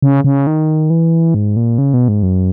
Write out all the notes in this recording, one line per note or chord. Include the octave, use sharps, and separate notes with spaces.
C#3
C#3
D#3
E3
G#2
A#2
C#3
B2
G#2
F#2